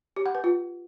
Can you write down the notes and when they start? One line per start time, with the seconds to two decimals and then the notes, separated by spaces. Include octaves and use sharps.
0.16 G4
0.26 F#5
0.35 B4
0.44 F4